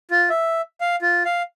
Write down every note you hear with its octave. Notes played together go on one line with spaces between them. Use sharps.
F4
E5
F5
F4
F5